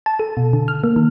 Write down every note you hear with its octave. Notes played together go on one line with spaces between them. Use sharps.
A5
A4
B2
D3
F6
A#3
D#3